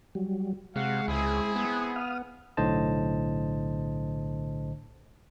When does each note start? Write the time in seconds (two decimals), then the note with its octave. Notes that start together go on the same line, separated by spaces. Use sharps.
0.15 F#3 G3
0.76 C3 G#3 F#4 F5 F#5
1.08 C#2 C4 E4 G#4
1.56 B3
1.96 F5 D#6 F6
2.57 B1 A2 D3 C5 D#5 A5